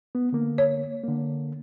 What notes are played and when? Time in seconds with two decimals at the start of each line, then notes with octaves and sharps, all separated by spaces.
0.15 B3
0.33 D3 A#3
0.58 C#5
1.04 D3 A#3